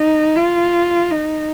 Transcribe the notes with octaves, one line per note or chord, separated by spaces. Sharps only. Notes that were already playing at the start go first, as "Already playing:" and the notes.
Already playing: D#4
F4
D#4